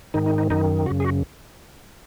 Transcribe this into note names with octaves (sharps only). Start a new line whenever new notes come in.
G#2 D#3 D#4
D#4
D#4
F#2 D#3 D#4
F#2 C#3 F#4
G#4
F#4